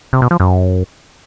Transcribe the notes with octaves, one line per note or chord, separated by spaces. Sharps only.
C3
B2
F3
F#2